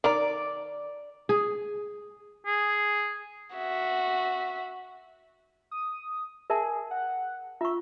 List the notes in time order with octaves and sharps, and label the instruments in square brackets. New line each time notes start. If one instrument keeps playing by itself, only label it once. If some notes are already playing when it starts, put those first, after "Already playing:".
[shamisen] D#3 A#5 [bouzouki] D5
[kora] G#4
[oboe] G#4
[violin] F#4 E5
[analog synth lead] D#6
[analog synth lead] G#4 [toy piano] A#4 E5 A5
[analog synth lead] F#5
[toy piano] F4 C#6 [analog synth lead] E5